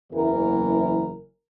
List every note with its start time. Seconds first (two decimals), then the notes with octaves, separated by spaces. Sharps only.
0.13 F#1 E2 E3 A#4